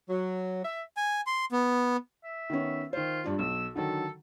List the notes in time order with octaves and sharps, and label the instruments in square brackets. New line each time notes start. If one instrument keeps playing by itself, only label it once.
[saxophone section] F#3
E5
[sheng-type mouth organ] G#5
C6
B3
[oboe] E5
[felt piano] D#3 B3 C#4
[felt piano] D#3 C5 [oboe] F4
[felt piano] G2 D4 F4
[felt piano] B1 [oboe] E6
[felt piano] D3 D#3 F#3 [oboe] A4